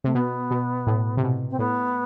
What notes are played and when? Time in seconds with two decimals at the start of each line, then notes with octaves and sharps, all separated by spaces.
0.04 C3 A3
0.14 B2 B3
0.51 B2
0.87 A2
1.17 C3
1.23 B2
1.50 C4
1.59 A2 B3